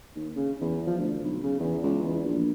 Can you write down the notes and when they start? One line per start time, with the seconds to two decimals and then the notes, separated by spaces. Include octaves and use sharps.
0.16 D#2
0.36 C#3
0.61 E2
0.87 F3
0.98 D2
1.24 B1
1.43 C#3
1.60 E2
1.83 C#2
2.02 E2
2.24 A#1